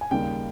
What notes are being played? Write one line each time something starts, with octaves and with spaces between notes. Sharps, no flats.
G#5
D#2 C#3 G3 A#3 D#4 G5